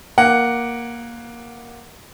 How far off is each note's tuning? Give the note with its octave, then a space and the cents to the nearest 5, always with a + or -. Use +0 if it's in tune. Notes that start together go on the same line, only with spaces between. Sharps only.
A#3 +10 F#5 +0